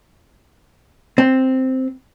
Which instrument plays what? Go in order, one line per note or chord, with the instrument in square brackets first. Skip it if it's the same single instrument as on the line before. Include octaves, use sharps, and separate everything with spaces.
[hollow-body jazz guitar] C4